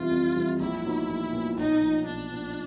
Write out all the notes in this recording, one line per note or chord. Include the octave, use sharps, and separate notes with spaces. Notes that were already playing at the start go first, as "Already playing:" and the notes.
Already playing: F2 C3 E3 G3 F4
F2
C3 E3 G3
A#1 E4
A#2 F#3 B3 D#4
A#1
A#2 F#3 B3 D#4
B1 D#4
A#2 F3
B1 D4
A#2 F3